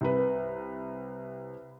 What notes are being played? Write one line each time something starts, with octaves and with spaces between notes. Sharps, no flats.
C2 B4